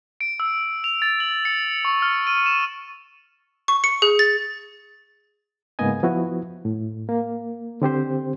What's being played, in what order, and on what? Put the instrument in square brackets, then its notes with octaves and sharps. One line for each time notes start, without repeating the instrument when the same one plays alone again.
[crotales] D7
E6
F7
A6
F#7
C#7
C#6
F6
D#7
E7
[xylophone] C#6
C#7
G#4
A6
[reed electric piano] G#2 C#3 A#3 B3 D#5 G#5
F3 B3 E4 F#4
A2
A#3
D3 C4 G4 C5